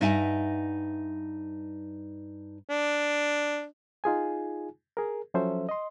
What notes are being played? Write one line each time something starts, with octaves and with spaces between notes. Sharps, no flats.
G2 D#4 E5 F#5 G#5
D4
D#4 F4 G#4 G#5
G#4 A#4
F3 F#3 C#4 A4 C5 E5
D#5 C6